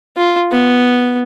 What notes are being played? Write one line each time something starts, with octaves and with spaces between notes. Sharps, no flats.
F4
B3